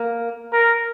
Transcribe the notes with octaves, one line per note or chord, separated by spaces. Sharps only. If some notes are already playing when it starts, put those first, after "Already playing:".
Already playing: A#3
A#4